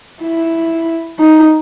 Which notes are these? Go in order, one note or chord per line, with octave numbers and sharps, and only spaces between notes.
E4
D#4